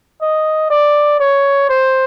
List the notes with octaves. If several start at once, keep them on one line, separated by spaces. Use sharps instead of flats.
D#5
D5
C#5
C5